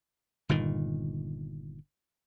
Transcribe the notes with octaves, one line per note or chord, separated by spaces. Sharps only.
G1 A#2 D#3